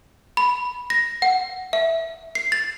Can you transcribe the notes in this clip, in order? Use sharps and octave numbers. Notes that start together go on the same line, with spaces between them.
B5
A#6
F#5
E5
C7
A6